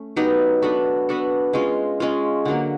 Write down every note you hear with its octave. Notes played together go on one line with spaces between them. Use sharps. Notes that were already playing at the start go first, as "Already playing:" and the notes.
Already playing: A3 C#4
F#3 B3 D#4 G4
B3 D4 F#4 A4
B3 D4 F#4 A4
G#3 C#4 F4
G#3 C#4 F4
D3 F#3 A#3